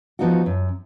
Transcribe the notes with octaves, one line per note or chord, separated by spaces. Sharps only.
F3 B3 D#4 F#4
F#2